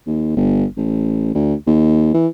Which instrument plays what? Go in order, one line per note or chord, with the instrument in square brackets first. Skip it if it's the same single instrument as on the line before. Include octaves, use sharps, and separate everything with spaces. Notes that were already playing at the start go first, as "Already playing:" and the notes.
[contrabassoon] D#2
G1
A1
D2
D#2
E3